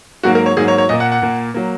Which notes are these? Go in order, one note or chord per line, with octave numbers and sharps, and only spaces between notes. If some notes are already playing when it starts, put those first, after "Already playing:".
G#2 F#3 A#3 F#4
A#4
C#5
G#2 F#3 A#3 G#4
C#5
C#5
A#2 A#3 D#5
F#5
F#5
A#2 A#3
F#3 A#3